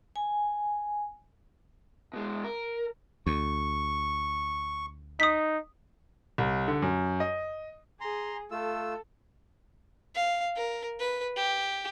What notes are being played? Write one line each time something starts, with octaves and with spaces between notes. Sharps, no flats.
G#5
B2 G#3
A#4
D2 C#6
D#4 D#6 B6
C2
D3
F#2
D#5
G#4 A#5 C6
A3 F4 A4 E6
F5
A#4
B4
G4